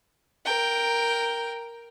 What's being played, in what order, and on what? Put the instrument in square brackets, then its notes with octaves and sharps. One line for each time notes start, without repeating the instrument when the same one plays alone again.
[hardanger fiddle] A#4 G5